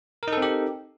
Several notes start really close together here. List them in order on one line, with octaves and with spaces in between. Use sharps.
A#4 D#4 A4 C4 G4